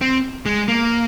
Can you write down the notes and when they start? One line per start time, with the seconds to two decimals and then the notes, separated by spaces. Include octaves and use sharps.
0.01 C4
0.46 G#3
0.68 A#3